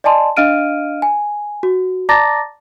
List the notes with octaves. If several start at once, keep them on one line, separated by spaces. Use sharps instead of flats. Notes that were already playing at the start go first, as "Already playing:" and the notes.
D5 D#5 G#5 A5 C6
D4 D#5 F5 F6 D7 D#7
G#5
F#4
D5 A5 A#5 D6 A6 A#6